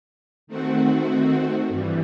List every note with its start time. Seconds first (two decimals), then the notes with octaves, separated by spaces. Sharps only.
0.47 D#3 A3 C4 F#4
1.68 G2 E3 G3